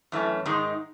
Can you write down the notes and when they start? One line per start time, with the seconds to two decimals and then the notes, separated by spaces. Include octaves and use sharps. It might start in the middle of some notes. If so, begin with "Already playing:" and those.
0.12 F#2 E3 A3 C#4
0.45 G#2 D#3 G#3 D#4